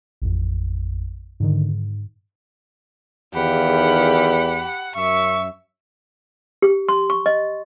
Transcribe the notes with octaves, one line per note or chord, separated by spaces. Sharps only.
A1 F2
G#2 D3 D#3
G#2
E2 D#3 G4 G#4 F5 F#5 B5
F#2 E5 C#6
G4
C6
C#6
D#5